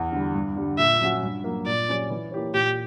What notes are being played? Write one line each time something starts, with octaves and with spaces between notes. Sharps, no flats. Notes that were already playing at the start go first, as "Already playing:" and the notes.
Already playing: E2
D3 G3
G2
D3 G3
A#2 E5
F#3 C#4 F#4
G2
F#3 A#3
A#2 D5
F#3 C#4 G4 C#5
E3
A#3 E4 G4 C#5
A#2 G4